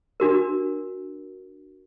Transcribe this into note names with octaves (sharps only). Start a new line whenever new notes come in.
D4 F#4 A#4